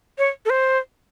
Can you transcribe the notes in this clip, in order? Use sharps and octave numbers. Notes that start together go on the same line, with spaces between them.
C#5
A4
C5